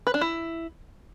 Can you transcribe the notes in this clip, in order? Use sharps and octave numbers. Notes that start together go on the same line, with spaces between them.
B4
D4
E4